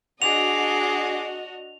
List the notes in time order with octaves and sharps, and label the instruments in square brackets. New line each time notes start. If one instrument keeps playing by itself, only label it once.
[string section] D4 F#4 D#5 [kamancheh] G#4 D6 [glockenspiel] F7